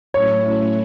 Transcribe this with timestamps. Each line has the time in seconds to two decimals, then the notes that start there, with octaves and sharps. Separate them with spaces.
0.13 A2 F#3 A3 C#4 E4 C#5